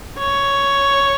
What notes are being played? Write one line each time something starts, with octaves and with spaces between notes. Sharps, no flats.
C#5